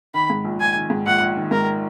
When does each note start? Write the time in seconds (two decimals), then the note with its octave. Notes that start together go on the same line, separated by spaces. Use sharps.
0.14 D#3 B5
0.30 G#2
0.44 A#1
0.60 A#1 G#5
0.75 D#3
0.90 G#2
1.06 A#1 F#5
1.20 A#1
1.37 D#3
1.51 G#2 A#4